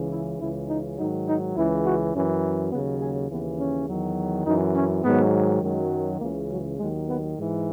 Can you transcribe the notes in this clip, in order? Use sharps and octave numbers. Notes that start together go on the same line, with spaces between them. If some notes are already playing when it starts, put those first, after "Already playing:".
Already playing: C#2 C#3 E3
E4
C#2 C#3 E3 E4
D#4
G#2 D#3 F#3 D#4
D#4
C#2 C#3 E3 E4
F#4
F#2 E3 C#4
D#2 C#3 F#3 B3
G#4
D#2 C#3 E3 B3
C#4
E2 D#3 F#3
F#2 E3 D#4
C#4
G#2 D#3 F#3 B3
F#2 D#3 F#3 G#3
C#2 C#3 E3 A#3
F#3
D#2 D#3 F#3 G#3
B3
G#2 E3